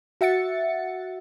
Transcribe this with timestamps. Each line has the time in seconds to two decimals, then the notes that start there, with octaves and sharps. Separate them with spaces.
0.21 F#4 E5 F#5 A6 C#7